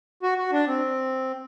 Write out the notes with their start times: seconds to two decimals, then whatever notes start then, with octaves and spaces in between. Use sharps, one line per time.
0.23 F#4
0.38 F#4
0.52 D4
0.67 C4